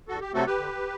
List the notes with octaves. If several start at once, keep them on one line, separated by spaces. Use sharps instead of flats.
E2 F#4 A4
G4
C3 F#3 A3 C4 F#4 A4
G4 B4
D3